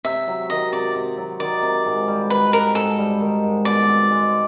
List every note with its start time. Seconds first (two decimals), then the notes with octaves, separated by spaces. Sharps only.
0.05 C3 E5
0.27 F#3
0.50 D#3 D#5
0.73 C3 D5
0.95 C3
1.17 F#3
1.40 D#3 D5
1.63 C3
1.86 G#2
2.08 G3
2.30 D#3 B4
2.52 G#2 A#4
2.75 G#2 A4
2.98 G3
3.20 D#3
3.43 G#2
3.65 B2 D5
3.88 C4
4.11 G#3